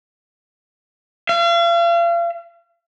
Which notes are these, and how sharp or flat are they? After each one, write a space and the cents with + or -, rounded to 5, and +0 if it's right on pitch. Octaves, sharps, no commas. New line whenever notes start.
F5 -40